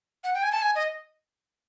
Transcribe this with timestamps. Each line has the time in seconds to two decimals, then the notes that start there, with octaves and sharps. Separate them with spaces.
0.24 F#5
0.34 G5
0.43 G#5
0.52 A5
0.62 G#5
0.75 D#5